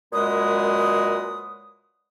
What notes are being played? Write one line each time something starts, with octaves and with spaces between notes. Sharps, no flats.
F#2 A#2 G#3 B4 D#6